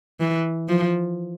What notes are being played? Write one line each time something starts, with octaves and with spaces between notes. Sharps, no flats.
E3
F3